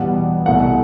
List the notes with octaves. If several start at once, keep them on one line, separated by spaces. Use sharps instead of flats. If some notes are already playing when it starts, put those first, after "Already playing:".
Already playing: E2 B2 G3 B3 F#5
C2 B2 A3 F#5